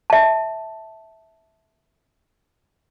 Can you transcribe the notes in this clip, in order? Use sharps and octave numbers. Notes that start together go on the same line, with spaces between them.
E5 A5